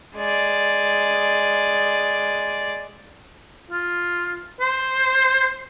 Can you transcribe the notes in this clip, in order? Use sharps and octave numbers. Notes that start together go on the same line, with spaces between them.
G#3 D5
F4
C5